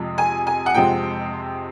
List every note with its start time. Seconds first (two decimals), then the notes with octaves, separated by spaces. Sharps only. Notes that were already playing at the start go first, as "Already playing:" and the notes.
Already playing: F2 C3 F3 G#3
0.18 G#5
0.47 G#5
0.66 F#5
0.74 F2 C3 F3 G#3 C4 G5